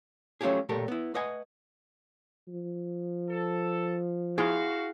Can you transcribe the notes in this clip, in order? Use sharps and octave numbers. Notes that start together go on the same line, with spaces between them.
F#3 A3 C#4 F4 G4 G#4
B1 A#2 A3 G4 A4 A#4
B3 E4
A3 B4 D#5 F#5 G#5
F3
A4
E4 F#4 G#4 F5 C6